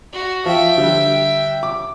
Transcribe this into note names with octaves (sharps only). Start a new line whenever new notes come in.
F#4
F3 E5 G5
D3 G3
D6